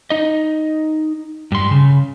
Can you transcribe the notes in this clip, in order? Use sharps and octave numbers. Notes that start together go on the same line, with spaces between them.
D#4 D#5
G2 C6
C#3